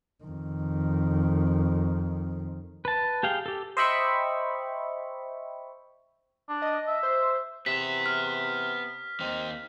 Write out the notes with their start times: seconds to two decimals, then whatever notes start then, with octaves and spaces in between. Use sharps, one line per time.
0.24 F2 D#3
2.85 B4 A5
3.23 G4 G#4 F5 G5
3.46 G4 A4
3.77 C5 D#5 E5 G5 B5 C#6
6.49 D4
6.62 D#5
6.88 E5
7.03 C5
7.66 C3 B3 E5 B6
8.06 F6
9.20 D#2 C4 D#4